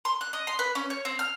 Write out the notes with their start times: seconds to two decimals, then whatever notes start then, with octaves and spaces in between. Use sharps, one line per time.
0.05 C6
0.21 F#6
0.33 D#5
0.47 C6
0.59 B4
0.75 C#4
0.90 C#5
1.05 C4
1.19 F6